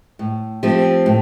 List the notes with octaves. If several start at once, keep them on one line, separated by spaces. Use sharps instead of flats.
A2
F3 A3 C4 G4
A2